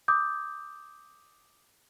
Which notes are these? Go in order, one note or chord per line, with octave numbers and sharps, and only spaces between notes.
D6 D#6 G6